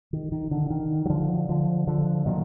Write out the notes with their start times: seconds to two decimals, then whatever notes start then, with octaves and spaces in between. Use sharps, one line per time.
0.13 D#3
0.32 D#3
0.51 D3
0.70 D#3
1.05 F#3
1.10 D3 F3
1.49 D3 F3
1.87 D3 F3
2.26 A#2 D#3 F#3